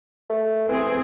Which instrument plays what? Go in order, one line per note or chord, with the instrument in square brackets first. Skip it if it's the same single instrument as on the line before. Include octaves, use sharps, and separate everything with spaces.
[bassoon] A3
[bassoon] E3 [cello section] C4 G#4